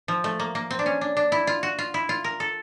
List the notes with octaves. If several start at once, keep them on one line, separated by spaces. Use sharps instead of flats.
F3
A3
A#3
A#3
C4
D4
C#4
D4
D4
E4
F4
F#4
F4
E4
F4
A#4
A4